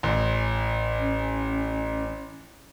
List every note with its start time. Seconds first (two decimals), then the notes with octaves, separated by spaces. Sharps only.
0.03 A1
0.99 C#4